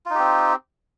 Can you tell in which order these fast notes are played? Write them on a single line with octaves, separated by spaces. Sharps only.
F4 D#4 G4 C4